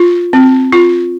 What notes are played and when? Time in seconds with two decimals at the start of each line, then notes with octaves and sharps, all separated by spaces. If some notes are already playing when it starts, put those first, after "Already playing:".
Already playing: F4
0.33 C4
0.72 F4